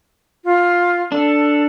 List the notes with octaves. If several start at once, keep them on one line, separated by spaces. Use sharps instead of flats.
F4
D4 A4